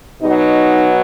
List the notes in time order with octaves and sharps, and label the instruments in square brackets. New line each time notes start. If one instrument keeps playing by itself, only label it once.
[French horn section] B2 F#3 D#4